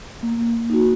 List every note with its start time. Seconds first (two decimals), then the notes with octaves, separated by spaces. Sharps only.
0.23 A#3
0.70 D#4 F#4